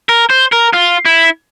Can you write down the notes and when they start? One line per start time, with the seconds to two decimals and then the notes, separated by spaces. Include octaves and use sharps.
0.09 A#4
0.30 C5
0.52 A#4
0.73 F4
1.05 E4